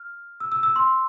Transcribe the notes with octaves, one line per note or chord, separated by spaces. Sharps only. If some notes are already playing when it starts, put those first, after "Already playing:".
Already playing: F6
E6
E6
E6
C6